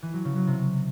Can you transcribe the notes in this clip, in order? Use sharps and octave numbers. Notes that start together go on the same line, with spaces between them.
E3
F#3
C#3
F#3
C3